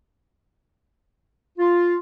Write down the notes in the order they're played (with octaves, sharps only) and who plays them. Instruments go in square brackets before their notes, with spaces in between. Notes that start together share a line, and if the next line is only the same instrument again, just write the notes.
[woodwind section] F4